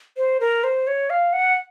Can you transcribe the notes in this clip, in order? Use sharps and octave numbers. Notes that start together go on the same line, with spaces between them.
C5
A#4
C5
C#5
F5
F#5